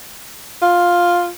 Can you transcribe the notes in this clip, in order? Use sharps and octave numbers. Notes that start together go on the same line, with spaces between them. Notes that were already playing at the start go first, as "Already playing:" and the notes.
F4